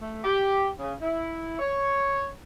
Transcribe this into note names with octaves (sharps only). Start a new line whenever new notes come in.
A3
G4
C#3
E4
C#5